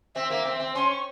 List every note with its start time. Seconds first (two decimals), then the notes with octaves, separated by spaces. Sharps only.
0.15 C4 E5
0.30 A#3
0.45 C4
0.60 C4
0.75 C#4 C6
0.90 C#6